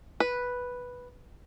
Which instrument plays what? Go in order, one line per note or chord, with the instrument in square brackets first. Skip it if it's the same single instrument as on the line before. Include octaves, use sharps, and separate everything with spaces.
[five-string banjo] B4